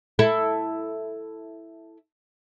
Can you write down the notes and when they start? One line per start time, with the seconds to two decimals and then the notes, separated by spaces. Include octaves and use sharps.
0.19 E4 A4